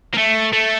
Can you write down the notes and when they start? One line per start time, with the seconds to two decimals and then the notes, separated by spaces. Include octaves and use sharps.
0.14 A#3
0.18 A3
0.53 A3